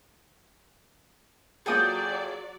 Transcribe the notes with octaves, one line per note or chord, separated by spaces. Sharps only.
F#3 A#3 F4 G#4 A4 D5 G5 D#6